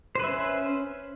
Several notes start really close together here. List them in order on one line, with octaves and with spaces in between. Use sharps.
C5 B4 E5 C#4